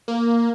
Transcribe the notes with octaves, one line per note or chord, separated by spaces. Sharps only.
A#3